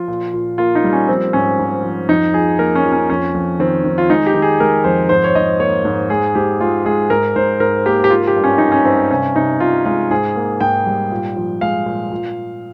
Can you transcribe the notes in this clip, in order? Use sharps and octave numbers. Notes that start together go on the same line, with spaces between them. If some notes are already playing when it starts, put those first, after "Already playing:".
Already playing: F3 F4
A#2
A#2
A#3 F4
D#4
G3
C#4
F3 C4
G#2 C#4
G#2
F3
F2 D#4
F3 G#4
A#3 A#4
C#4
F3
C#4
F2 C#4
F2
D#3 C4
D#3
F4
G#3 D#4
G4
D#3
G#4
G#3 A#4
F2 C5
G#2 C5
C#5
G#2 D#5
A#3 C#5
G#2
G#3 G#4
G#2 G4
G#3 F4
G#3 G#4
G#2 A#4
G#2 C5
G#2 A#4
A#3 G4
G4
A#3 F4
G4
G2
C#4
G2 D#4
C#4
G2 C4
C3 C#4
C3 D#4
C3 F4
G#3 F4
G#2 G#4
A#3
G#2 G5
G3
A#2
F3
G#3 F5
A#2
A#2